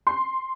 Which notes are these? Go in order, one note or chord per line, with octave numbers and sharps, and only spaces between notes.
C6